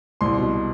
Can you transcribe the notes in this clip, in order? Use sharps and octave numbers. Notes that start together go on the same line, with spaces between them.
C2 C6
B2